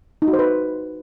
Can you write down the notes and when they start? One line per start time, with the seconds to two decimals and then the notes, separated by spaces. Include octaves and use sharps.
0.22 D#4
0.28 F#4
0.33 C5
0.39 B4